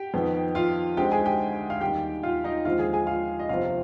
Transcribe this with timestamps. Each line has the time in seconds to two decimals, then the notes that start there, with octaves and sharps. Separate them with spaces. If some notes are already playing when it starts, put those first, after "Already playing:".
Already playing: G4 G5
0.14 F2 D#3 B3
0.55 F4 F5
0.97 D2 D3 G#3 C4 D#4 G4 G5
1.12 G#4 G#5
1.25 G4 G5
1.70 F5
1.81 D#2 D#3 G3 G4 G5
2.23 F4 F5
2.44 D#4 D#5
2.65 D#2 D3 F3 G#3 C4 F4 F5
2.79 G#4 G#5
2.93 G#4 G#5
3.07 F4 F5
3.39 D#5
3.49 G1 F2 C3 F3 C4 F4 F5